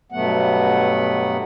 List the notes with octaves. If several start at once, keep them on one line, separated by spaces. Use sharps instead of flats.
G2 B2 F#3 A3 B3 F#5